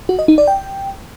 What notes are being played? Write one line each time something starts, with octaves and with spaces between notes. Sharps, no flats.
F#4
D#5
D#4
D5
G5